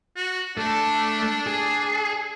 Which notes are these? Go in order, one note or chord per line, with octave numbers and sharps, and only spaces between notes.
F#4
A3 D4 A4
G#4